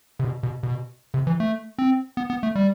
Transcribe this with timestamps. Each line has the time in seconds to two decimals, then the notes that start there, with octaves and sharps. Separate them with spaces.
0.20 C3
0.24 B2
0.43 B2
0.63 B2
1.14 C3
1.27 E3
1.40 A3
1.78 C4
2.17 B3
2.30 B3
2.43 A3
2.55 G3